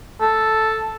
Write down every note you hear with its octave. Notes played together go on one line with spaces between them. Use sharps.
A4